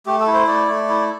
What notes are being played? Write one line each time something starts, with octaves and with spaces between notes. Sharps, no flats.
A3 G4
A4
E4
C5
A3 D5
A3
E4